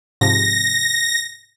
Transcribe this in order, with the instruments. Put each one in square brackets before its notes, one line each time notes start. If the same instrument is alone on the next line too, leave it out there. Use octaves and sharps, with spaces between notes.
[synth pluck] G#2 C3 F3 [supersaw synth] A#6